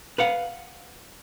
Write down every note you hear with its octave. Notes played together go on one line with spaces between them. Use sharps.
B4 F5 F#5